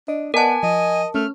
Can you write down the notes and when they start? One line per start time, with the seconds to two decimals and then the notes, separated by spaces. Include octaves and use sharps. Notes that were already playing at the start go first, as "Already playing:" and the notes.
0.08 D4 D#5
0.34 B3 A#4 D5 D#5 F#5 G#5 A5
0.63 F3 D#5
1.15 A3 C#4 F6